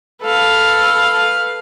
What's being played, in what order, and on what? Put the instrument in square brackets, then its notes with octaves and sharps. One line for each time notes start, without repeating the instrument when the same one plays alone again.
[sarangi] A4 [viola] B4 F5